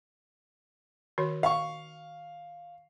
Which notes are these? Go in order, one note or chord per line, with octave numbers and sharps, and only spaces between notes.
D#3 F#4 C#5
F5 C#6